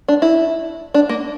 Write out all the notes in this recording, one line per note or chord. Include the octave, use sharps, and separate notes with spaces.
D4
E4
D4
A#3